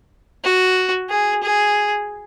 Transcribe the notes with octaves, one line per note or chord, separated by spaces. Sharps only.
F#4
G#4
G#4